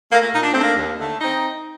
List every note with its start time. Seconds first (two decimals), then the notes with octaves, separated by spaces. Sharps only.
0.10 A3 A#3
0.21 A#3
0.32 A#2 D#4
0.41 D4
0.52 A3 C4
0.61 A#3 D4
0.76 D#2
0.98 D3 A3
1.20 C4 D#4